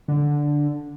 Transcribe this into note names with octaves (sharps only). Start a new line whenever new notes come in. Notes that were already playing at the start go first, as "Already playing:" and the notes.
D3